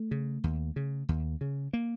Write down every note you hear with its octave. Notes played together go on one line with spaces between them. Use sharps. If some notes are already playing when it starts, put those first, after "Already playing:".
Already playing: A3
C#3
D#2
C#3
D#2
C#3
A#3